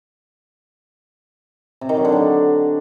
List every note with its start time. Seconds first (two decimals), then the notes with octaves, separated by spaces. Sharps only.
1.81 C3
1.89 D#3
1.97 F#3
2.05 D3
2.12 D4